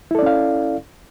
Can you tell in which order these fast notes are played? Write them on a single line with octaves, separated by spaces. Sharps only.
E4 A4 D5 C#4 F5